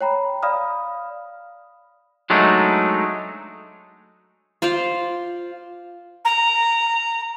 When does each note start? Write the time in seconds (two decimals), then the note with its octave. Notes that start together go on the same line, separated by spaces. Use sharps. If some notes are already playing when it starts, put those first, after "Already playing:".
0.01 C#5 G5 A#5 B5
0.42 D5 F5 B5 D#6 F6
2.30 F#3 G#3 A3 D4 D#4
4.62 F4 C5 D5 F5
6.25 A#5